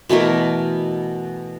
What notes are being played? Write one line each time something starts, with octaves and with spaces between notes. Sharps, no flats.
B2 E3 A3 A#4